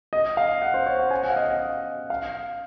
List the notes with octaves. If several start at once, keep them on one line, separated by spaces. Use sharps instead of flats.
D#5
F5
F#5
C5
C#5
F#5
G#5
F#5
F5
D#5
D#5
F5